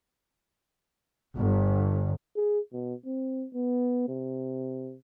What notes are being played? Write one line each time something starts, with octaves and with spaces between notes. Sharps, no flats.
G1
G#4
B2
C4
B3
C3